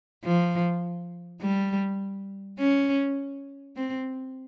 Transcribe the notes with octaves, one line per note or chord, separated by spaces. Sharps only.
F3
G3
C#4
C4